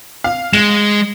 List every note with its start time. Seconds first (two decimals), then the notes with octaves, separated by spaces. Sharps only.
0.24 F5
0.53 G#3 E7